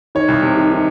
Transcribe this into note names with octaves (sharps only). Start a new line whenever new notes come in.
D#3 C#5
C2
C3
D#3
D#3